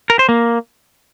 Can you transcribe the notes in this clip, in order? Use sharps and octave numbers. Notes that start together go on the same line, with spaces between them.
A#4
C5
A#3